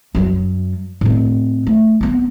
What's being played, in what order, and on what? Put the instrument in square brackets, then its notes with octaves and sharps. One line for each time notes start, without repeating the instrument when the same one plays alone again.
[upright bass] F#2 F#3
A2 C4
A3
B3 C4